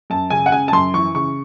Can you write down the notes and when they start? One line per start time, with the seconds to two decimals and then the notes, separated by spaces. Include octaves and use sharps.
0.10 F#2 A5
0.30 C#3 G#5
0.46 F#5
0.52 C#3 G#5
0.68 A5
0.72 F#2 C6
0.94 E3 C#6
1.15 C#3 C#6